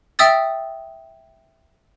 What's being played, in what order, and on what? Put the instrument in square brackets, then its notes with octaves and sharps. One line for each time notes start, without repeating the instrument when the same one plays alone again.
[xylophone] E5 G5 D#6 E6 A6